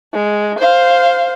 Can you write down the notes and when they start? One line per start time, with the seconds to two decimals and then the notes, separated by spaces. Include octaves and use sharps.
0.13 G#3
0.59 C5 F5